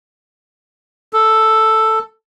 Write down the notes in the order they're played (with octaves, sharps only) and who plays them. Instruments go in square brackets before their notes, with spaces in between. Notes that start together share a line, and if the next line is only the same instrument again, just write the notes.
[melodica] A4